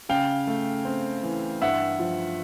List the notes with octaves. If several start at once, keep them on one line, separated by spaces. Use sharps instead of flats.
C#3 F5 G5
A3
C4
E3
G2 E5 F#5
F3